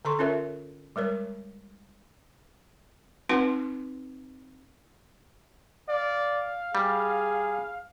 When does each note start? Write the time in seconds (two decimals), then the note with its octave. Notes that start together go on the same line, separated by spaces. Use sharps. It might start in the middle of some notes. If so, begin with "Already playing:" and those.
0.05 D3 A4 C6 C#6
0.19 C#4 F4 A#4 C#5 E5
0.96 G3 G#3 A#4 C#5
3.29 C4 D#4 F#4 B4 F#5 C6
5.89 D5 F5
6.75 G3 G#4